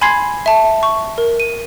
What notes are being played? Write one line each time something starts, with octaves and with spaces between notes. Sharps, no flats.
G#5 B5 C6 G#6 C7
E5 A5
C#6
A#4
D#7